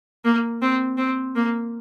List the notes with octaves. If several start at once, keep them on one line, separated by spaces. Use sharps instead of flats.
A#3
C4
C4
A#3